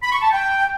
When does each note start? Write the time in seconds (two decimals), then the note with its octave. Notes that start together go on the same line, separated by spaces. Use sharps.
0.02 B5
0.12 C#6
0.22 A5
0.32 G5